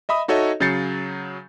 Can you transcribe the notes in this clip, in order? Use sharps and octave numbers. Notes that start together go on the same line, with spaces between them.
D#5 E5 B5 D#6
D#4 F#4 A4 C#5 D#5 E5
C#3 F#3 G6 A6 C7 C#7